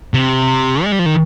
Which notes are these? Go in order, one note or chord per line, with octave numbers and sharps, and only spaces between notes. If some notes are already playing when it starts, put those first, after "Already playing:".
C3
G#3
G3
F3
D#3